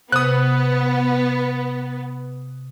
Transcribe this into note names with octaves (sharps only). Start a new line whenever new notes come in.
C3 B3 D#6 F#6